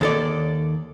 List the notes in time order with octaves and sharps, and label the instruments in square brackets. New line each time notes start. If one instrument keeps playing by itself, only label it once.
[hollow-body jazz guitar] D#2 A4 D5